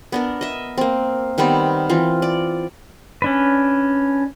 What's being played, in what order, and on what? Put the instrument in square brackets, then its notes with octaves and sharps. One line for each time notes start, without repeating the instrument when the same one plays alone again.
[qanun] B3 D4 A#4
D#5 E5
A#3 C4
D#3 G3 B3 C4
E3 C4 F4
D5
[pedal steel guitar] C#4 D4 B4